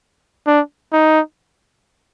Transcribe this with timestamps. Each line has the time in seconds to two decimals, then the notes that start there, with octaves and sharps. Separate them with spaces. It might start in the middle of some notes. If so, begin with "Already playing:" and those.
0.47 D4
0.93 D#4